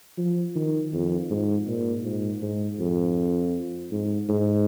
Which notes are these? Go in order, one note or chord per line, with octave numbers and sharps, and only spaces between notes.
F3
D#3
F2
G#2
A#2
G#2
G#2
F2
G#2
G#2